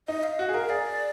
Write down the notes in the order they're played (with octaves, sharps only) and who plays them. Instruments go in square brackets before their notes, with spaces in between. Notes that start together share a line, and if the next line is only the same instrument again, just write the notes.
[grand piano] D#4 [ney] D#5
[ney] F5
[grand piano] F#4 [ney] F#5
[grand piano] G#4
[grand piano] A#4 [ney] F5
[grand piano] G#4 [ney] D5